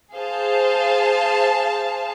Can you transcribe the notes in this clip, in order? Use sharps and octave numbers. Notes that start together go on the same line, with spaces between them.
G#4 C5 F5 A5